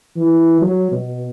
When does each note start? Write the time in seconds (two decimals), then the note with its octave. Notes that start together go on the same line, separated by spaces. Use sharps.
0.16 E3
0.62 F#3
0.92 B2